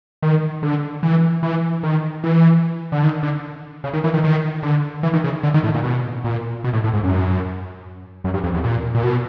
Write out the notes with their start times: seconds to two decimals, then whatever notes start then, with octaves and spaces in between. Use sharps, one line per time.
0.22 D#3
0.63 D3
1.03 E3
1.43 E3
1.83 D#3
2.24 E3
2.92 D3
3.03 D#3
3.23 D3
3.84 C#3
3.93 D#3
4.04 E3
4.14 D#3
4.24 D#3
4.63 D3
5.03 E3
5.14 D#3
5.24 C#3
5.43 D3
5.54 D#3
5.63 A2
5.74 A#2
5.84 B2
6.24 A#2
6.64 B2
6.73 A2
6.84 A2
6.94 G#2
7.04 F#2
8.24 F#2
8.34 G2
8.44 F2
8.54 E2
8.64 A#2
8.95 A#2
9.04 B2